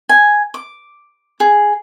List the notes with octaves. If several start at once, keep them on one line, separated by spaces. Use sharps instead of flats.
G#5
D6
G#4